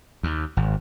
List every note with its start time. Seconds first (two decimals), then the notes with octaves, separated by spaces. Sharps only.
0.23 D#2
0.57 G#1